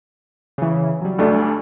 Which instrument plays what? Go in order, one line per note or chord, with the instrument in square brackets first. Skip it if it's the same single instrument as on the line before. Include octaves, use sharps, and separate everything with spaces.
[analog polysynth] C#3 E3
F#3 G3
[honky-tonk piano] D2 A3 D4